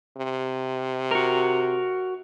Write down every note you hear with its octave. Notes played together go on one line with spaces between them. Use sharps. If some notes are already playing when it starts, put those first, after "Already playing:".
C3
F#4 A#4